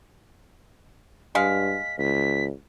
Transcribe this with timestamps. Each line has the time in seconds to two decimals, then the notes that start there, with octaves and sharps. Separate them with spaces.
1.35 G2 G#3 F5 B6
1.99 C#2 B6